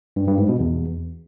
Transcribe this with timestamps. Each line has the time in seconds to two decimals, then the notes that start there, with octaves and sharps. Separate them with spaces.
0.16 G2
0.27 G2
0.38 G#2
0.49 B2
0.60 E2